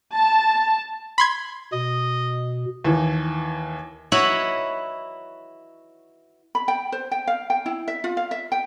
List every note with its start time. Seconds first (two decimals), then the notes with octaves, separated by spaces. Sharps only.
0.15 A5
1.18 B5 C6 G#6
1.73 B2 D#5
2.85 D#2 E3
4.12 E4 F#4 B4 C#5 D#5 A#5
6.55 B5
6.68 G5
6.92 C5
7.12 G5
7.27 F5
7.50 G5
7.66 E4
7.88 E5
8.04 F4
8.17 F5
8.31 E5
8.52 G5